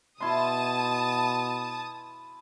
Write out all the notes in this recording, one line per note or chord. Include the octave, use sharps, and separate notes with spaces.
B2 E4 A5 C6 D#6